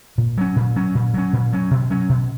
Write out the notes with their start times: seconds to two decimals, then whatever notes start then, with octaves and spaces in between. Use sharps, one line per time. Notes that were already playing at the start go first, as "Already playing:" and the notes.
0.18 A#2
0.38 F#3 C#4
0.56 A#2
0.76 F#3 C#4
0.95 A#2
1.14 F#3 C#4
1.33 A#2
1.53 F#3 C#4
1.71 B2
1.91 F#3 C#4
2.09 B2